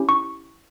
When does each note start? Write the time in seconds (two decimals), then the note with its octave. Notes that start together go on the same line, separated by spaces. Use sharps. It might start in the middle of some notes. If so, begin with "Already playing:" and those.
Already playing: C#4 E4 G4
0.09 C#6